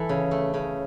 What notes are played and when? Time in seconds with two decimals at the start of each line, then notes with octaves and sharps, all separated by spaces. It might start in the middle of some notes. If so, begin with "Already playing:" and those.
Already playing: E3 A4
0.09 C#3
0.31 A3
0.54 C#3